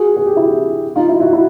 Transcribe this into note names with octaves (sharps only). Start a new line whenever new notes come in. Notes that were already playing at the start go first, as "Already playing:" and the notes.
Already playing: F#4 G#4
G#4
G4
E4 F#4
D#4 F4
E4 F#4
E4 F#4
E4 F#4